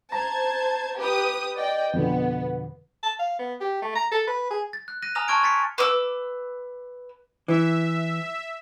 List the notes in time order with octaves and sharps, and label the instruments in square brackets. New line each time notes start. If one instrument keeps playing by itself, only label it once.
[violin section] C5 A5 G#6 [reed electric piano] A#5
[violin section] G4 B4 D#6
D5 D#5 G5
[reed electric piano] F2 B2 D3 [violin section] B3
[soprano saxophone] A5
F5
B3
G4
A3
A#5
A4
B4
G#4
[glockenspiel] A6
F#6
F#6 A#6 D#7
G#5 A#5 D#6 F6 A#6 F7
A5 C6 C#6 F6 G#6 D7
C6 A6 B6 C#7
[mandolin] B4 D6 E6
[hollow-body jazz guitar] E3 [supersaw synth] E5